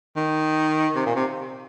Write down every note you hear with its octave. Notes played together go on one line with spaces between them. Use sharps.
D#3
C3
A#2
C3